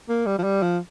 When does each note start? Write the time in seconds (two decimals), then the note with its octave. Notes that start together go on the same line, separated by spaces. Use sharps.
0.09 A#3
0.26 G3
0.39 F3
0.44 G3
0.62 F3